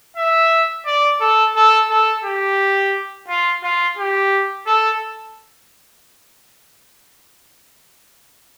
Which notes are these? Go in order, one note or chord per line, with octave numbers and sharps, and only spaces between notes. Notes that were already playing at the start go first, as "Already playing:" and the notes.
E5
D5
A4
A4
A4
G4
F4
F4
G4
A4